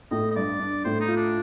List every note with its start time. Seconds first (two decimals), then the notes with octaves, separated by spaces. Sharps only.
0.11 A2 D#5
0.31 D#5
0.36 G2 D5
0.59 D4
0.84 A2 C5
1.00 D#4
1.08 F4
1.16 D4